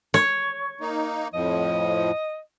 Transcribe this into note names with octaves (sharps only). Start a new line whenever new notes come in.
C#5
A#3 D#4
F2 A2 F3 D#5